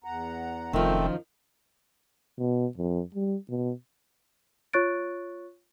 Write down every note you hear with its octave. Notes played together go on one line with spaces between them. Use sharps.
E2 F#5 A#5
F1 F#2 D#3 F3 A3 C4 F4 C5
B2
F2
G3
B2
F4 C#5 C#6 F#6 A6 D7